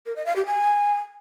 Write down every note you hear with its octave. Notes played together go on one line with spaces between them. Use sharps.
A#4
D#5
F5
G4
G#5